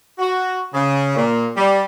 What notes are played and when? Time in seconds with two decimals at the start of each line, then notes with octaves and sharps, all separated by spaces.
0.19 F#4
0.74 C#3
1.16 A#2
1.57 G3